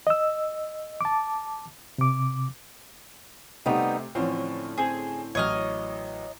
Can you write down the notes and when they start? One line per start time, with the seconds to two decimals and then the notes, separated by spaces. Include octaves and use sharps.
0.07 D#5 E6
1.01 A5 D6
1.98 C3 D6
3.66 C3 G3 A3 B3 C4 D#4
4.15 A2 D3 E3 F3 C4 C#4
4.78 C4 G#4 C5
5.35 A1 F#3 C#5 D#5 F6